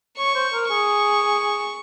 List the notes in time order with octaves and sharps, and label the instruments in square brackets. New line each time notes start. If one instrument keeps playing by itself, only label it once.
[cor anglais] C#5 [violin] C#6
[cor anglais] C5
A#4
[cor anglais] G#4 [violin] C#6